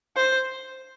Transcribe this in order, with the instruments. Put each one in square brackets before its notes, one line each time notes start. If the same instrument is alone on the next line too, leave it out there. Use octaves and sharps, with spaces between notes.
[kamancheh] C5